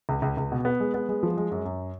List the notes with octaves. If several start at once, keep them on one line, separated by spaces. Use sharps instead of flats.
C#2
C#2
C#2
B2
B3
G#3
B3
G#3
F3
G#3
F#2
F#2